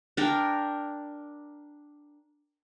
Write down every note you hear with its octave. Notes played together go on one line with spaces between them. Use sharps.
D4 A#4 G5